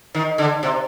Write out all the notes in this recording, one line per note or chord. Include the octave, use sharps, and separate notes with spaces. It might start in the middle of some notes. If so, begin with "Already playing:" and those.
D#3
D3
C3